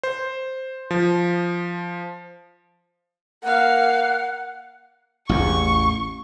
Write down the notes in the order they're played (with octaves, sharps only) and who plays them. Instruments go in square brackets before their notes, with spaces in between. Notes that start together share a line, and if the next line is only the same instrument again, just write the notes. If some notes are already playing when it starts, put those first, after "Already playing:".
[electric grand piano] C5
F3
[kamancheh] A#3 F5 [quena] F#5
[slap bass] A1 E2 [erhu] C#6